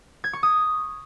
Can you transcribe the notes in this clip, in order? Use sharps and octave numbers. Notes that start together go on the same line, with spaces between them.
G#6
C#6
D#6